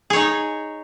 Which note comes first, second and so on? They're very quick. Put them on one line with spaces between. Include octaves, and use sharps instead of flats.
G#4 C#5 D#4